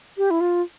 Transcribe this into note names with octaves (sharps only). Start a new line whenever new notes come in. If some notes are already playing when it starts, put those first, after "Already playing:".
G4
E4
F4